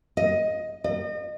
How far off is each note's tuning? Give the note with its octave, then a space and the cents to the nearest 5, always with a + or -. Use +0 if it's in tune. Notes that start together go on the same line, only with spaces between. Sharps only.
D#5 +10
D#5 -35